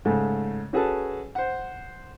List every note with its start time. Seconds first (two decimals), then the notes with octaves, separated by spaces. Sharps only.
0.05 G#2 C#3 A3
0.73 C#4 F#4 G#4 A4 B4 A5
1.35 C5 F#5